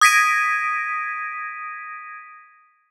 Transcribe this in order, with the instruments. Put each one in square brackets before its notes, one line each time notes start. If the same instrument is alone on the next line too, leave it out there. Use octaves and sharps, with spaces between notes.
[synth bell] D#6 G#6 A#6 B6 D7 D#7